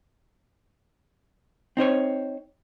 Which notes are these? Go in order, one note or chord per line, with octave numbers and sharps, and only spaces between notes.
C4 D#4 C5 C#5